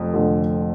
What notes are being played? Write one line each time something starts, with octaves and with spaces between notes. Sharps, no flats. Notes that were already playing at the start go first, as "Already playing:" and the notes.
Already playing: F1 F2
F1 F2 D3